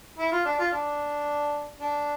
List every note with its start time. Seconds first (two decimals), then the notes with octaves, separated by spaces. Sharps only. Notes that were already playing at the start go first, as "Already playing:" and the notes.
0.18 E4
0.32 F4
0.45 D4
0.59 F4
0.72 D4
1.80 D4